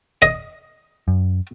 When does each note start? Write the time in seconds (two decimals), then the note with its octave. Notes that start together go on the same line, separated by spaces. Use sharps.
0.22 D#5
1.08 F#2